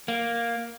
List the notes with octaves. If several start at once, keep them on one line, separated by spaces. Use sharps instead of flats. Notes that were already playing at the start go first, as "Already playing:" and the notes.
A#3